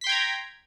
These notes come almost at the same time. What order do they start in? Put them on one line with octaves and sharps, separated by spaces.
B6 C6 G5 G#6 A#5